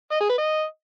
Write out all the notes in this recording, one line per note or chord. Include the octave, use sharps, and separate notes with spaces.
D#5
G#4
B4
D#5